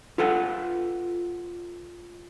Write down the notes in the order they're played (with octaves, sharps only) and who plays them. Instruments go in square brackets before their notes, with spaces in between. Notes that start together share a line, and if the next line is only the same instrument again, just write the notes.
[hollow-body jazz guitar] F4 A4 B4 F#5